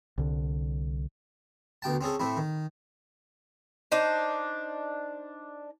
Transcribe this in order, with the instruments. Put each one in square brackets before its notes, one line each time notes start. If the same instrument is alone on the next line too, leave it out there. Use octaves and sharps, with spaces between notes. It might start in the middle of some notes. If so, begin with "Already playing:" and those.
[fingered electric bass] C2 D3
[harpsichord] D2 B2 G5 A5
C4 C#4 G#4 A4
A2 A3 C4 E4
D#3
[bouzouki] D4 D#4 C5